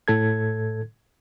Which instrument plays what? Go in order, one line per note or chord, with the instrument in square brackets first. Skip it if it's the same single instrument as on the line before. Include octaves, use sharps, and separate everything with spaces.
[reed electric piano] A2 A4 G#6